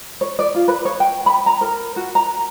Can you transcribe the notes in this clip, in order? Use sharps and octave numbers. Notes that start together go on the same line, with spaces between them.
C#5
D5
F4
B4
C#5
G5
B5
A#5
A#4
F#4
A#5